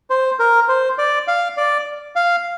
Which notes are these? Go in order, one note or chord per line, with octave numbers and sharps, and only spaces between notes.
C5
A#4
C5
D5
F5
D5
F5